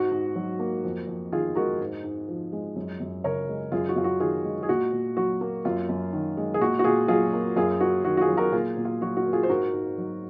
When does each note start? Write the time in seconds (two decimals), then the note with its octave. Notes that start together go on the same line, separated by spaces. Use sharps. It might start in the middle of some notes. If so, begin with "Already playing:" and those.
Already playing: G#2 F#4
0.11 G#2
0.36 F#3
0.59 A#3
0.84 F2
1.07 F2
1.32 D#3 F4 G#4
1.55 G#3 F#4 A#4
1.81 G#2
2.03 G#2
2.29 F3
2.52 G#3
2.76 F#2
3.00 F#2
3.24 C#3 A#4 C#5
3.48 G#3
3.72 F#2 F4 G#4
3.89 F#4
3.96 F#2 F4
4.04 F#4
4.20 D#3 F4 G#4
4.44 G#3
4.63 G#4
4.69 A#2 F#4
4.92 A#2
5.17 F#3 F#4
5.41 A#3
5.65 F#2 F4
5.89 F#2
6.13 D#3
6.37 G#3
6.54 G#4
6.60 A#2 F#4
6.79 F#4
6.84 A#2 F4 G#4
7.08 F#3 F4 G#4
7.33 A#3
7.56 F#2 F4 G#4
7.80 A#3 F#4
8.05 D#3 F#4
8.17 F#4
8.21 F4 G#4
8.29 F#3
8.37 F#4 A#4
8.52 A#2 F4 G#4
8.77 A#2
8.85 F4
9.01 F#3 F#4
9.17 F#4
9.26 A#3
9.33 F4 G#4
9.43 C5
9.49 G#2 F#4 A#4
9.73 G#2
9.98 F#3